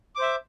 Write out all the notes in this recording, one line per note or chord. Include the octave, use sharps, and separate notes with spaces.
C5 E5 D6